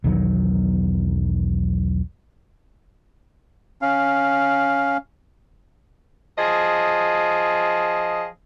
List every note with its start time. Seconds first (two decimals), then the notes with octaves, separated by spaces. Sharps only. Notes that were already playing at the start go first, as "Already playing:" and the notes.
0.04 B1 E2 D#3 F#3
3.82 C#4 F5
6.37 F3 G#4 D#5